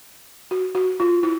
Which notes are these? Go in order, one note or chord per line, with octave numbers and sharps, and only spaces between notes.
F#4
F#4
F4
E4